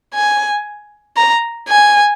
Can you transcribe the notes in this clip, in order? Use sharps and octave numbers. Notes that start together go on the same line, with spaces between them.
G#5
A#5
G#5